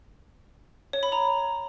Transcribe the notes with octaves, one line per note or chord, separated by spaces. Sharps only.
C#5
B5
A#5